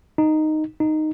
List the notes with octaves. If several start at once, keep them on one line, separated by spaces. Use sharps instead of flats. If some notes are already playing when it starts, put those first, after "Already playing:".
D#4
D#4